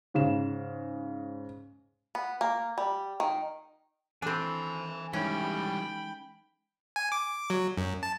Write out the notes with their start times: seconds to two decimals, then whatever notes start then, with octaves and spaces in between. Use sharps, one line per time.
0.14 G#2 C#3 E7
2.15 B3
2.41 A#3
2.78 G3
3.20 D#3
4.22 E3 C4 D4 A4 G#5 B5
5.13 E3 G3 G#3 C#4 D#4 G5 B5
6.96 G#5
7.12 D6
7.50 F#3
7.77 F#2
8.03 A5